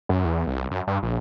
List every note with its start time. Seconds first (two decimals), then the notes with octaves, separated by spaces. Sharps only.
0.09 F#2
0.25 E2
0.47 C2
0.71 F#2
0.87 G2
1.03 A#1